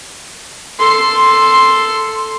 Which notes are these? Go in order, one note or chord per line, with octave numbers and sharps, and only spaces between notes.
A4 C6